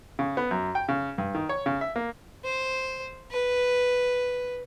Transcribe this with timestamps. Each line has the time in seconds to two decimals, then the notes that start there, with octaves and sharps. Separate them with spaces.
0.19 C#3
0.37 B3
0.51 F#2
0.75 G5
0.89 C#3
1.18 G2
1.35 D#3
1.49 C#5
1.66 C#3
1.81 E5
1.96 A#3
2.44 C5
3.31 B4